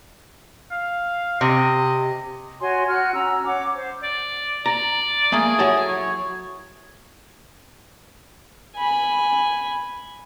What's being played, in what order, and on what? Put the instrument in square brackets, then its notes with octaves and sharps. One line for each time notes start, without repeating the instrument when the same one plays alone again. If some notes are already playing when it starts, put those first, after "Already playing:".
[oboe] F5
[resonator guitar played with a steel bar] C3 [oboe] D#5
[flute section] F#4 C#5 G#5 C6
F#4 F#5 F6 F#6
C#4 A#5 E6
C#5 F#5 D6
C5
[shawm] D5
[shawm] D5 [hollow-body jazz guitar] A#5
[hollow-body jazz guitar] A3 A#3 [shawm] G#4
[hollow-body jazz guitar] F#3 E4 A4
[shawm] C#5
[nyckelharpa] G#5 B5